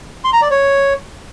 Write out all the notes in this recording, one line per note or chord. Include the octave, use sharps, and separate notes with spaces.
C6
A#5
D5
C#5